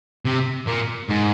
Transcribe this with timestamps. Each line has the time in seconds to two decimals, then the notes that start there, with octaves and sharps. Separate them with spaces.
0.25 C3
0.67 A#2
1.09 G#2